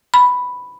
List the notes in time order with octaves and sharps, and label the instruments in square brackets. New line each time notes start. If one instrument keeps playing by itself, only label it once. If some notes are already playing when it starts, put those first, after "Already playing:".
[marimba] B5